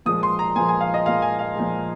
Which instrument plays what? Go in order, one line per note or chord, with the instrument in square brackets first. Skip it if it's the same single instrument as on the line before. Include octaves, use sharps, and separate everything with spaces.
[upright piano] A#2 F3 G#3 D#6
C6
A#5
A#2 F3 G#3 G#5
G#5
F5
D#5
A#2 F3 G#3 F5
G#5
F5
A#2 F3 G#3